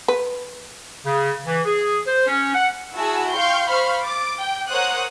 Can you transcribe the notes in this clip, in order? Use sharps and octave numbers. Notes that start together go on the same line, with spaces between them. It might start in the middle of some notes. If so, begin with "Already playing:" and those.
B4
C#3
E3
G#4
C5
C#4
F#5
E4 F#4 G#4 G#5 A5 E6
F5 G5 C6 C#6 G6
C5 F5 B5 C#6 F6
D6 A6
G5
A#4 C5 C#5 F#5 D#6 F#6